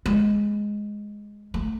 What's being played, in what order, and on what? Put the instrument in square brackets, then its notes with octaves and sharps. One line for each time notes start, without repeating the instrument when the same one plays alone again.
[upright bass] G#3
A3